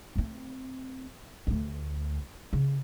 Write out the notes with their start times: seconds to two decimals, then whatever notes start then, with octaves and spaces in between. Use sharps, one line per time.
0.16 A3 C4
1.47 D2 A3
2.53 C#3